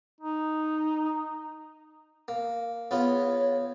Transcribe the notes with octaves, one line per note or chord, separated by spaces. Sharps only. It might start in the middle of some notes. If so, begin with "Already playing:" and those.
D#4
A#3
E2 B3 F4 C#5